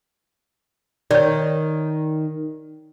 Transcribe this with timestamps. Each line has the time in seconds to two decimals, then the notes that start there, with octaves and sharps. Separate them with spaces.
1.11 D#3 C#5 D5